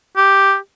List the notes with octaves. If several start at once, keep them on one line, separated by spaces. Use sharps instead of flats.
G4